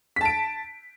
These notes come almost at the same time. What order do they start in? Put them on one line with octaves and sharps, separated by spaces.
B6 A5 D7